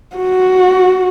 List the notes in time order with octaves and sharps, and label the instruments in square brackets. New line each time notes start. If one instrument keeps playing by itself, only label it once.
[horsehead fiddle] F#4